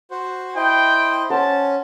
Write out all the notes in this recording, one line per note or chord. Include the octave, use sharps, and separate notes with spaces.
F#4 C5
E4 C5 D#5 G5
C#4 C5 F#5 A5 C6